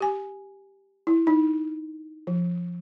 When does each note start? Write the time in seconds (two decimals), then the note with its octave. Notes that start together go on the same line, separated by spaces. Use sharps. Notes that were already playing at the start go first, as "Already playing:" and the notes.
0.01 G4 G#5
1.07 E4
1.27 D#4
2.27 F3